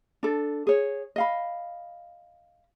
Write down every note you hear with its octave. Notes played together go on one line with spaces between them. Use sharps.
D4 A4
G#4 C#5
D#5 F5 B5